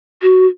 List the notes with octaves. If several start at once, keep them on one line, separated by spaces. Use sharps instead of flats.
F#4